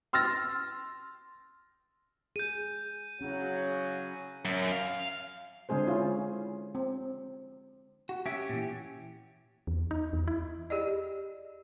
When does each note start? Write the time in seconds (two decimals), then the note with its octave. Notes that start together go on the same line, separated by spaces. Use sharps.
0.13 C6 E6 F6 A6 A#6
2.36 G#4 G6 D#7
3.21 C#3 F#3 C#4 E4
4.45 F#2
4.72 F5
5.69 D3 G#3 C4 G#4 C5
5.87 C#4 E4 F4
6.75 C4
8.09 F#4
8.26 C#4 G4 E5
8.49 A#2 E3
9.67 E2
9.91 D#4
10.13 E2
10.28 E4
10.70 G4 G#4 D5 D#5